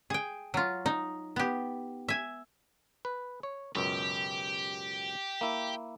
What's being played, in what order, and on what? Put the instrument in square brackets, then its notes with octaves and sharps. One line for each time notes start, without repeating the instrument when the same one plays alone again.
[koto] G#4 G5
F#3 F4
D#4
B3 G4
E5 G#5
[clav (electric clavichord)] B4
C#5
[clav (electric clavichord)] C#2 F#2 B2 [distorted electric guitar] G4
[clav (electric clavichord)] A#3 E4